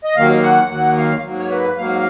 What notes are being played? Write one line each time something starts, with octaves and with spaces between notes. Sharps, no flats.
D#5
D#2 D#3 F#3 A#3 F5
F#5
D#2 D#3 F#3 A#3 F#5
F5
G#2 F#3 A#3
C#5
B4
G#2 F#3 A#3 F5